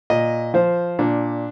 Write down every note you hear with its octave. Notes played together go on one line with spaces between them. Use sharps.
A#2 D#5
F3 C5
A#2 D4